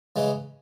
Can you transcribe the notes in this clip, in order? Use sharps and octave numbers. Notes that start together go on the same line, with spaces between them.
C#3 E3 G#3